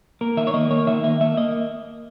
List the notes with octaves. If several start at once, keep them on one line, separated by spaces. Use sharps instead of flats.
A#3 A#4
D#3 E5
C#5
A#3 D#5
A#3 C#5
D#3 E5
A#3 E5
A#3 E5
A#3 D#5